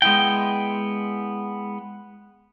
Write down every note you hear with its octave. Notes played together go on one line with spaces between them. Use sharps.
G#3 B3 E4 G5